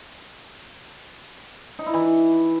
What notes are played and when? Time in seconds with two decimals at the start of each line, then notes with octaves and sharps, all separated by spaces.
1.79 D#4
1.86 E4
1.94 E3